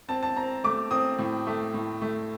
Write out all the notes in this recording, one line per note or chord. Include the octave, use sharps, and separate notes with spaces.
C4 A5
A5
C4 A#5
A3 D6
C4 D#6
A2
A3
A2
A3